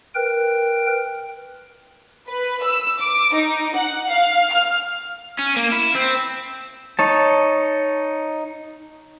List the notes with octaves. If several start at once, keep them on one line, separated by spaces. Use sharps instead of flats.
A#4 B4 G5
B4
E6
D6
D#4
F#5
F5
F6
C#4
A#3
E4
C4
D#4 C#5 A5